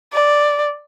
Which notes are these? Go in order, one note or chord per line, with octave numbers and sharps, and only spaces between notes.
D5